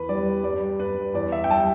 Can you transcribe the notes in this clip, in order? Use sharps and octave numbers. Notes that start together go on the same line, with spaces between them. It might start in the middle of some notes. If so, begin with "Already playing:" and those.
Already playing: E2 B4
G3 D5
G2 D5
G2 B4
E2 D5
E5
G5
G3 A5